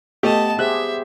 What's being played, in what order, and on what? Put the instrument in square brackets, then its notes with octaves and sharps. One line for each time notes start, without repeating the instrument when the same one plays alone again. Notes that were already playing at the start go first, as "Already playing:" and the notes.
[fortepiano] A3 G4 [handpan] B3 [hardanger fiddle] D#5 A5
[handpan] G4 G#4 C5 [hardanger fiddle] E5 [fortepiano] F#6